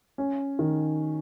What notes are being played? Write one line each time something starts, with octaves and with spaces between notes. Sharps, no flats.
C#4
D#3